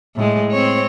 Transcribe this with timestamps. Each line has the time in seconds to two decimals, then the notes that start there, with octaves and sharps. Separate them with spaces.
0.16 A2 G#3
0.51 C4 C#5